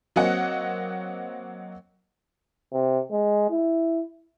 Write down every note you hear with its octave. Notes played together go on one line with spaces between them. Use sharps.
F#3 A#3 C4 D#5 F#5
C3
G#3
E4